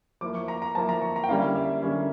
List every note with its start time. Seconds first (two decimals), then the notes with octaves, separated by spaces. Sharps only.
0.21 F3 A#3 E4 D6
0.35 C#6
0.48 A#5
0.62 A#5
0.75 F3 A#3 E4 A5
0.89 A#5
1.02 C#6
1.16 A#5
1.24 G5
1.29 D3 G3 A#3 C#4 E4 F5
1.56 E5
1.82 D3 G3 A#3 C#4 E4